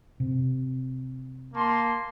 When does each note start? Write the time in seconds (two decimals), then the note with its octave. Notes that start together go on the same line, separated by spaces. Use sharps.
0.20 C3
1.54 A#3 A5 C6